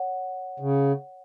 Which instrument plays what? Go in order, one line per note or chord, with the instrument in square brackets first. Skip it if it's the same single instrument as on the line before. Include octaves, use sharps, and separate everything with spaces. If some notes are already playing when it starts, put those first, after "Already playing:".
Already playing: [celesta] C#5 F#5
[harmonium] C#3